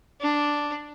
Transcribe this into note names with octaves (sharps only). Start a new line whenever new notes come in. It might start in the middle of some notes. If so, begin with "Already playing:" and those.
D4